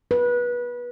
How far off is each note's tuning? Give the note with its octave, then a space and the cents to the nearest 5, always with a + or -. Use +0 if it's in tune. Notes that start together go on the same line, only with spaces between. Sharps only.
B4 -25